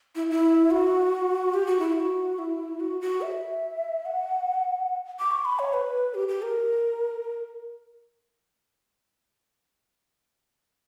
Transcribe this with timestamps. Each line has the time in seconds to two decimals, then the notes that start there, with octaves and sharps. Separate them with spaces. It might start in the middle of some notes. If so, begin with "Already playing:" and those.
0.15 E4
0.31 E4
0.71 F#4
1.54 G4
1.67 F#4
1.79 E4
1.93 F#4
2.38 E4
2.80 F#4
3.01 F#4
3.21 E5
4.06 F#5
5.19 D6
5.31 C#6
5.45 B5
5.59 C#5
5.73 B4
6.14 G4
6.28 G4
6.42 A#4